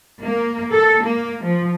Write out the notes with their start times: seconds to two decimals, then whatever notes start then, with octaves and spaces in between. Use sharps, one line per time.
0.23 A#3
0.72 A4
1.03 A#3
1.44 F3